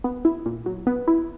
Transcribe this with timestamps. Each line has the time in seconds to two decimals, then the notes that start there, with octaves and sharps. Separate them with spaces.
0.04 B3
0.25 E4
0.46 A#2
0.66 F#3
0.87 B3
1.08 E4